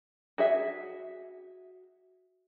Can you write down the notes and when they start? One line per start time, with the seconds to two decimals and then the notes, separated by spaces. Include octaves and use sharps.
0.38 F#4 G#4 E5